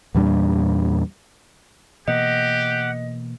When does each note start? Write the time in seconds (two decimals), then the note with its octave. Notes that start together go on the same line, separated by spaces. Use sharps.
0.15 E2 A#2 G3 D4
2.08 B2 E3 A#3 G4 D#5 F#5